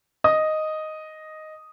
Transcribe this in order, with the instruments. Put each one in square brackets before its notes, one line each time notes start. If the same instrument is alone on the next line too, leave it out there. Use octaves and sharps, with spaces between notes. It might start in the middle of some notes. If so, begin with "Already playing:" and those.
[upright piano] D#5 D#6